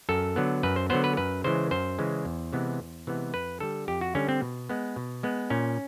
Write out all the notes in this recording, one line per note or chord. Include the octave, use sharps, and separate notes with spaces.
F#2 A4
D3 F#3 B3
F#2 B4
C5
D3 F#3 B3 C5
B4
F#2 B4
C#3 E3 G#3 C5
F#2 C5
C#3 E3 G#3
E2
C3 E3 G#3 B3
E2
C3 E3 G#3 B3
F2 B4
D3 G3 A4
F2 G4
F#4
D3 G3 C#4
C4
B2
G#3 B3
B2
G#3 B3
A#2 C#4